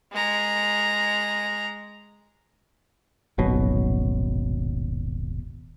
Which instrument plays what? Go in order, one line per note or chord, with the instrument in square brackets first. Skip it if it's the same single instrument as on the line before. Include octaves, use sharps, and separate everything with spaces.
[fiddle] G#3 A#5
[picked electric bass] D#1 G#1 B2 F#3